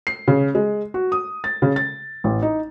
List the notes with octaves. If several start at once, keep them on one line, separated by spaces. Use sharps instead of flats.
C7
C#3
G#3
F#4
D#6
A6
C#3
A6
A1
D#4